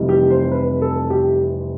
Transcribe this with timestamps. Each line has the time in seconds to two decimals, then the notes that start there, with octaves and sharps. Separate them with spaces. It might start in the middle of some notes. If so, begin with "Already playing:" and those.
Already playing: F1 F2 C3 E3 G3
0.09 G4
0.30 C5
0.51 B4
0.82 A4
1.10 G4